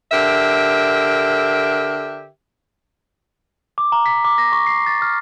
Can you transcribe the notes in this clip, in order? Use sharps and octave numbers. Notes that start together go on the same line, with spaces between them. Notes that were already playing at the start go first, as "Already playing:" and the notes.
D3 G4 A#4 E5
D6
A#5
B6
D6
A#6
C#6
C7
A6
F6